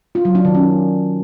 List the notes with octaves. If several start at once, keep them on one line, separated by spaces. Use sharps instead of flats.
F4
F#3
D4
D#3
C#4